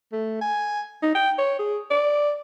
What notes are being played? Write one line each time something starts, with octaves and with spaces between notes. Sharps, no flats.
A3
G#5
D#4
G5
C#5
G#4
D5